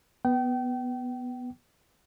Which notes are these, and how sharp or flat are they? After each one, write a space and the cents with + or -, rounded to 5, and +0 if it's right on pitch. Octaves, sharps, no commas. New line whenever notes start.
B3 +0 G5 -35